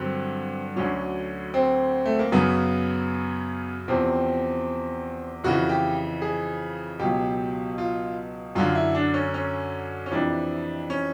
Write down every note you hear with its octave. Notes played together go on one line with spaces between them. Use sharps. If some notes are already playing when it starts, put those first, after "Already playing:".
Already playing: G2 D3 F#3 C4
D2 D3 F#3 C#4
C4
A3
A#3
F#2 C#3 F#3 B3
E2 C3 F3 C4
F2 C#3 E3 F#4
G4
G#4
C#2 B2 F#3 G4
F4
F#2 D3 F#3 F4
E4
D4
C#4
C#4
C#4
F2 C3 E3 D4
C#4